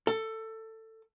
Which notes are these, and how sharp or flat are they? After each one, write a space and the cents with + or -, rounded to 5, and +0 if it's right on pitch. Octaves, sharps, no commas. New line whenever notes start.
A4 +15